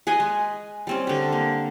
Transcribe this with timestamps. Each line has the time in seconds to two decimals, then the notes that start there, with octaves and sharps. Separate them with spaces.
0.07 G#4 B4 D#5 G#5
0.20 G#3
0.87 G3 C4 C#4
1.07 D3 G4
1.32 A#3